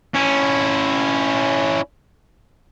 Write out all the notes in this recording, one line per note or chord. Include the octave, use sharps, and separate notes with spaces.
C#4 E4